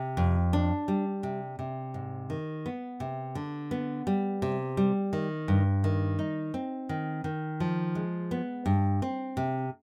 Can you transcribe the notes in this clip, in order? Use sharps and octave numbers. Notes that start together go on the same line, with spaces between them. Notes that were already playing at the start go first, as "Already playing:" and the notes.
Already playing: C3
F2
D4
G3
C3
C3
G#2
D#3
B3
C3
D3
B3
G3
C3
G3
D#3
G2
D#3
D#4
C4
D#3
D#3
F3
G#3
B3
G2
C4
C3